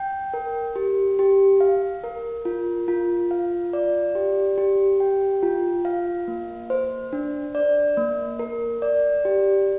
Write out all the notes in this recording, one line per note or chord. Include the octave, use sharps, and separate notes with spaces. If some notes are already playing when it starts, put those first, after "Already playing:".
Already playing: G5
A#4
G4
G4
F5
A#4
F4
F4
F5
D5
G4
G4
G5
F4
F5
A#3
C5
D4
D5
A#3
A#4
D5
G4